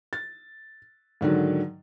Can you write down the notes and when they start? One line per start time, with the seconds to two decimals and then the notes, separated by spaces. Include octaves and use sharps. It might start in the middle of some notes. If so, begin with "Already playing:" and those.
0.13 A6
1.21 G#2 D3 D#3 F#3